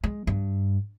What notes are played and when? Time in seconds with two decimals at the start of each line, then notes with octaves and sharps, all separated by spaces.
0.04 G#3
0.27 G2